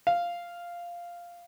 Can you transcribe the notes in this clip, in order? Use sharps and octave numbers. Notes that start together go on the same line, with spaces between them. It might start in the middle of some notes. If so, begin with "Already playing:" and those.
F5